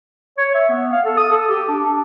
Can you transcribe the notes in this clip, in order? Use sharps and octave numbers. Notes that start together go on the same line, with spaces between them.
C#5
E5
B3
F5
A4
D#6
A4
G4
D4
D4